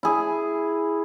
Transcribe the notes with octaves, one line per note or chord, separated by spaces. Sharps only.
E4 G#4